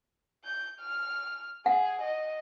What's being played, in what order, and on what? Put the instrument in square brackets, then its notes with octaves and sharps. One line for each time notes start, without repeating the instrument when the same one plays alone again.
[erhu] G6
F6
[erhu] G#4 [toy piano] F#5
[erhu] D#5